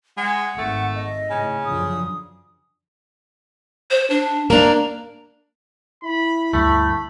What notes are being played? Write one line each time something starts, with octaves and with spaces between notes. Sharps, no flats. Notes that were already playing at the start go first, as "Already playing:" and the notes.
G#3 F#5
G#1 A3
D#5
A2 C#3
F#2 D3 F3 D#6
C5
D4
A#3 D4 A#5
E4 B5
D2 G2 A3 B5